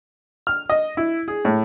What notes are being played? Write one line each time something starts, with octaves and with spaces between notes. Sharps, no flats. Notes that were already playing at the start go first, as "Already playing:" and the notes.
F6
D#5
E4
G#4
A2